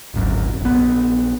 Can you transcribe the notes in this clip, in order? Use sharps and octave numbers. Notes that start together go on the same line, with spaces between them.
D1 G#1 F#2
A#1 B3